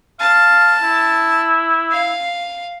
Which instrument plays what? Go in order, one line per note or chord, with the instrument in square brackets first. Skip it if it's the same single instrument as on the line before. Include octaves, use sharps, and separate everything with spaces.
[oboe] F5 [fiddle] A5
[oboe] E4
[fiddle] F5